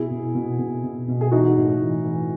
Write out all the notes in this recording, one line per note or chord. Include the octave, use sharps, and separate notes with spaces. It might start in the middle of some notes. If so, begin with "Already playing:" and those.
Already playing: B2 E4 G#4
B2
B2
B2
B2
B2
G#4
E3 D#4 F#4
A2
E3
E3